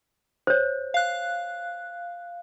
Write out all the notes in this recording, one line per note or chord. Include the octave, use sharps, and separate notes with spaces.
C5 C#5
F5 F#6